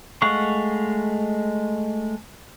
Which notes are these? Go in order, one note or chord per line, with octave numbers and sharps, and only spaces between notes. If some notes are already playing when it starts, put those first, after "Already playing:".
G#3 A3 F5 F#5 C#6